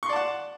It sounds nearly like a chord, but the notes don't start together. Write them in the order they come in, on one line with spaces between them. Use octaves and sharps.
C#6 C6 D5 A5 F#5